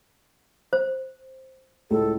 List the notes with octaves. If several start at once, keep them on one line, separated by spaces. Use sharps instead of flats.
C5
C#2 A2 A4